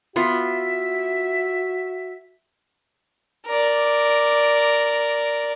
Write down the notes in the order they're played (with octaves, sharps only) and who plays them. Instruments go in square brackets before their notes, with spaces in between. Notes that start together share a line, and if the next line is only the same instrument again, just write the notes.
[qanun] B3 F4 [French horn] F#4 [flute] E5
[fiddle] A#4 D5